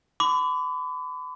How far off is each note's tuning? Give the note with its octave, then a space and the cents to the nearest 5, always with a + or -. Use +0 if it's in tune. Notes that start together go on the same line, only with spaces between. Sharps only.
B5 +40 D6 -15